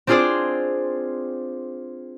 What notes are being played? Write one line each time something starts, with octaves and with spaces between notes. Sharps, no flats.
C4 D4 F4 G#4 C5 D5